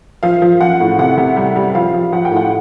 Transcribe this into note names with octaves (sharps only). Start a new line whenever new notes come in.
F3 F5
F3
F3 F#5
A2
C3 F#5
C3
G3
G3
F3 F5
F3
F3 F#5
G5
A2
F#5